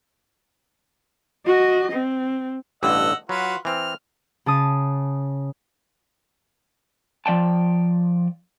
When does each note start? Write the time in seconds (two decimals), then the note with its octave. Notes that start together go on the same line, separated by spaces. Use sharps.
1.47 F#4 D#5
1.92 C4
2.83 A1 G2 D3 D#5 F#5 E6
3.29 F#3 F4 F#4 B4
3.65 E3 C4 F6
4.46 C#3 A5 D#6
7.26 F3 D5 G5 A5